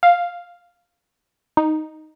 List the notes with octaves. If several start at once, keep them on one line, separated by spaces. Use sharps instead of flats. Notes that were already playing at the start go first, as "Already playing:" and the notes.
F5
D#4